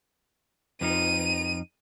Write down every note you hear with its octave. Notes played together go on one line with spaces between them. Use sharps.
F2 F3 D#4 D#7